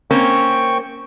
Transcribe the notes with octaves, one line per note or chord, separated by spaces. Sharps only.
A#3 C4 C#4 G5 C#6